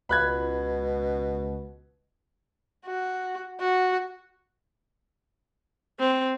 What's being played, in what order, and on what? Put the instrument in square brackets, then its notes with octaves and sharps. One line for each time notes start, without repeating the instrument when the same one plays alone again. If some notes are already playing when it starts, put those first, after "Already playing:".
[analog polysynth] C#2 [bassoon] B2 [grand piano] B5 F#6 G#6
[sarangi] F#4
F#4
[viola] C4